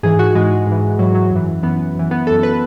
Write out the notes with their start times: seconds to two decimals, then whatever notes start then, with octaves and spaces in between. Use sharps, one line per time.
0.03 G#2 E3 G#4
0.19 F#4
0.35 G#2 E3 G#3
0.67 G#2 E3
0.99 G#2 E3 F#3
1.15 F#3
1.31 F#2
1.36 E3
1.63 F#2 E3 B3
1.95 F#2 E3
2.11 B3
2.27 F#2 E3 A4
2.43 B4